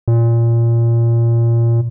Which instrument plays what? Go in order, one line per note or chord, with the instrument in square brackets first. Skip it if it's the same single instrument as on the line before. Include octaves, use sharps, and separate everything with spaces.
[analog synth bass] A#2